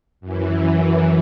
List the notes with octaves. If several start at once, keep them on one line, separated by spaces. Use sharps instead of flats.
F#2 E3